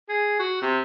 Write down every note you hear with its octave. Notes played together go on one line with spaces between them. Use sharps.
G#4
F#4
C3